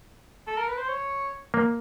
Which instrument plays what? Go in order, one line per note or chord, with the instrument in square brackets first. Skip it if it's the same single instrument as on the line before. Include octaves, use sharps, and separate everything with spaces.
[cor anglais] A4
A#4
B4
C5
C#5
[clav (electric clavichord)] A#3